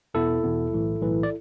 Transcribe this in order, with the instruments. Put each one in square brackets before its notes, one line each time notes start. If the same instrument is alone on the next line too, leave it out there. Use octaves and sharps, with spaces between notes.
[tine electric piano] E2 B2 B3 E4 A4
E2 B2 B3
B1 A2 E3
B1 A2 E3
D5